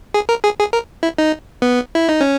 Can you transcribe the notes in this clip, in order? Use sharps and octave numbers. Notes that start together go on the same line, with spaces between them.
G#4
A#4
G#4
G#4
A#4
E4
D#4
B3
E4
D#4
C#4